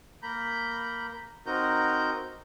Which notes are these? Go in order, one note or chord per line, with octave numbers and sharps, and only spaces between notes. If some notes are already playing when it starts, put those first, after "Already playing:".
A#3 A#5 B5 G6
C4 D#4 F#4 A#4 A#5 G6